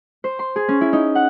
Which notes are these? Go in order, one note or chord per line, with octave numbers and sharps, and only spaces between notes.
C5
C6
G#4
C#4
E4
D#4
F#5